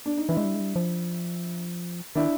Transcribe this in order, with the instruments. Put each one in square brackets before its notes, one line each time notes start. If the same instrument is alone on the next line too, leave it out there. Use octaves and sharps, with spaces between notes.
[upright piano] D4
D#4
[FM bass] E3 [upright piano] D4 E4
[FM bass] G#3
G3
G#3
G3
F3
[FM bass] D#3 [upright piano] D4 E4